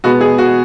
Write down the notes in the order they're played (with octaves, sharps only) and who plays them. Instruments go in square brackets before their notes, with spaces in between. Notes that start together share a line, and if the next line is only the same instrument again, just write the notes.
[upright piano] B2 G#3 B3 F#4
G#4
F#4